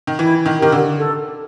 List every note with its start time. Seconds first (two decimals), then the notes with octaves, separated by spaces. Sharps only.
0.07 D#3
0.19 E3 E4
0.46 D#3
0.59 D#3 G4 A#4
0.72 D3
0.98 A4